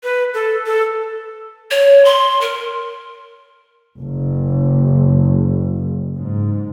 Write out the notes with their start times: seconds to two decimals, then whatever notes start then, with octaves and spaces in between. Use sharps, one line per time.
0.03 B4
0.34 A4
0.66 A4
1.71 C#5
2.05 C6
2.41 A#4
4.00 F#1
6.16 G#2